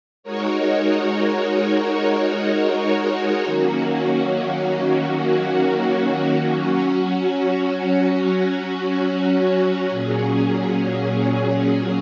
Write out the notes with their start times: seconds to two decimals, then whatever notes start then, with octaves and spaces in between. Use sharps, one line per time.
0.23 G#3 D#4 F#4 A#4 C#5
3.45 D#3 F#3 A#3 C#4 F#4
6.68 F#3 C#4 F#4
9.90 A#2 F#3 C#4 G#4